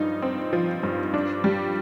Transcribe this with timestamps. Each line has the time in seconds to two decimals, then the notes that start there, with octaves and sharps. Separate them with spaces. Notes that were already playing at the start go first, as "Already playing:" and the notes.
Already playing: G2 F3 D#4
0.22 C4
0.53 F3
0.83 G2
1.14 D4
1.44 G3